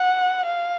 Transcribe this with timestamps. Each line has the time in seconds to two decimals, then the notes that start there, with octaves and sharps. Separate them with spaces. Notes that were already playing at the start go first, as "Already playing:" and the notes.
Already playing: F#5
0.47 F5